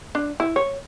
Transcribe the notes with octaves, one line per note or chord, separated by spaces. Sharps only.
D4
E4
C#5